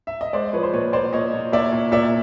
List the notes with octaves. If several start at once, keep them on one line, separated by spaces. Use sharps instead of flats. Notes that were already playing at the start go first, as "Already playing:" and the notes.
E5
D#5
G#3 C5 D5
F3 B4 C#5
C5
A#2 B4 C#5
A#2 C5 D5
A#2 C#5 D#5
A#2
A#2 D5 E5
A#2
A#2 D5 E5